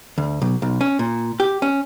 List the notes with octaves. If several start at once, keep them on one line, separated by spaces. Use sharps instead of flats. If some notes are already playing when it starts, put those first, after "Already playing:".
D2
B1
B1
C#4
A#2
G4
C#4